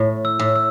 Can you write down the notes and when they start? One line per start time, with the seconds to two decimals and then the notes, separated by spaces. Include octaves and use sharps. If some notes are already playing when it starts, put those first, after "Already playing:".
Already playing: A2
0.25 E6
0.39 A2
0.56 E6